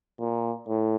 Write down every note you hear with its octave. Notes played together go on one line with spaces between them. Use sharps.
A#2
A2